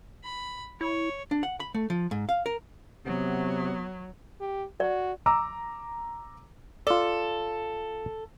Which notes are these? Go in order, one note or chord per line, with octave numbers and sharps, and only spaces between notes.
B5
E4 C#5
D4
F#5
B5
A3
F3
G#2
F5
A#4
C3 F#3 B3
G4
F#4 D5
A#5 D6 E6
F4 A4 D5